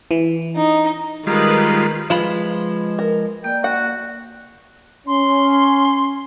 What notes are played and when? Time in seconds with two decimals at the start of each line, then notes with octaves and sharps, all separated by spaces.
0.11 E3
0.57 D#4
1.27 D#3 G3 G#3 D#4 F4 B4
2.10 F3 G#3 F4 B4 B5
2.99 A#4
3.44 A#3 D5 G5
3.64 F#4 F#5
5.07 C#4 C6